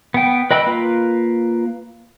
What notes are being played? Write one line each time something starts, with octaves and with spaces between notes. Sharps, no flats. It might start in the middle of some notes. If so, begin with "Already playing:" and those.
B3 G5
B4 D#5 G5 B5 E6
A#3 F4 B4